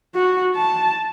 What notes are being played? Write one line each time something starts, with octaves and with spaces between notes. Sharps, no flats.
F#4
A5